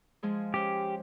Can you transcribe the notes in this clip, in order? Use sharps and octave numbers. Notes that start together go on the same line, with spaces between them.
F3 G#3 G#4
C#4 G4 C5